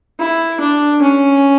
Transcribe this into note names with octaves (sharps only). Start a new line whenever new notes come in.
E4
D4
C#4